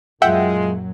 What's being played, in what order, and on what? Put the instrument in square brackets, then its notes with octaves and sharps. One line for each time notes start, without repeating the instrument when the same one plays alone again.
[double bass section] F#2 A#2 F#3 [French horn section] G#3 F4 [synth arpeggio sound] E5 F#5 G5